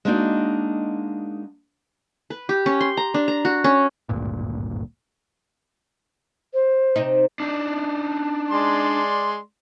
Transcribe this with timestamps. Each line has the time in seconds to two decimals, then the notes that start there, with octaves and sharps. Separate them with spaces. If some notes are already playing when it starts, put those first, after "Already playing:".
0.05 G#3 A#3 B3 D4 D#4 F#4
2.30 B4
2.49 G4
2.66 C#4
2.81 C6
2.97 A#5
3.14 D4
3.28 A#5
3.45 F#4
3.64 C#4
4.09 G#1 D2 G2 A#2
6.54 C5
6.96 C3 C4 D#4
7.40 D4 D#4
8.51 G#3 D5 C6